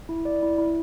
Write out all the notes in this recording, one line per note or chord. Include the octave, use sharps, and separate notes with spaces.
E4
D5
E4
E4